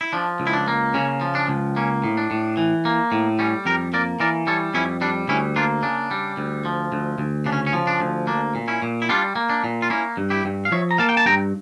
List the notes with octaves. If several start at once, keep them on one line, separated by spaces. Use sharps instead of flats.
E4
F3 D4
C#2
E4
D4
A#3
C#3 C#4
F3
D4
C#2
A#3 C#4
A2
D4
A2
E3
A#3
A2
G3 C#4
F2 G4 A#4
A#3 A#4 D5
E3 A#4 D5
G3 A4 C#5
F2 C#4 E4
G3 D4
D2 C#4 E4
A#3 D4 F4
C#3 D4
G3
D2
F3
D2
D2
C#3 D4
C#4
C#4
F3
D4
D2
A#3 D4
A#2
C#4 E4
A#2
E4
G3 D4 F4
A#3
D4
A#2
F4
A#3 C#4 E4
G2
E4 G4
G2
F5
F3 C#5 E5
A#5
A#3 F5 A5
G5
A5
G2 G5 A#5